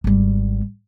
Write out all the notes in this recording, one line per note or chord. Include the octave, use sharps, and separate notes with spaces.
G#1 G3